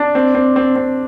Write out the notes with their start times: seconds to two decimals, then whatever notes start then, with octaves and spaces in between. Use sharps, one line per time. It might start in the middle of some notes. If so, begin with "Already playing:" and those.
Already playing: D4
0.15 C4
0.35 C4
0.56 C4
0.76 C4